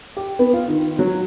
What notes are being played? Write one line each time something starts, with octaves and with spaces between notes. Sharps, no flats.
G4
B3
F4
D#3
F#3